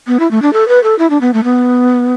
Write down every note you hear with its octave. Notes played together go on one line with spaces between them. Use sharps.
B3
E4
A3
D4
A4
B4
A4
E4
D4
B3
A3
B3